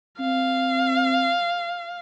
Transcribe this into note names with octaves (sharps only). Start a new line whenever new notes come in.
C4 F5